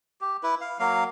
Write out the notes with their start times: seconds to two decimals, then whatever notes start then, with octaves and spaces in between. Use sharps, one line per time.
0.21 G4
0.43 E4 B4
0.61 F5
0.79 F#3 A#3 F5